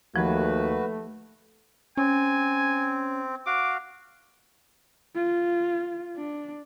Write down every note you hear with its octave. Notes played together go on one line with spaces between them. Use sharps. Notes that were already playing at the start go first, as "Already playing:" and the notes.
D#2 F3 A3 F#4 B4
C4 C#4 G#5
F#4 F5 D6
F4
D4